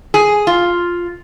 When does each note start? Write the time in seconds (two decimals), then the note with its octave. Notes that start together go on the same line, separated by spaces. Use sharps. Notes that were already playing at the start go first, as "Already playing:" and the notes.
0.14 G#4
0.47 F4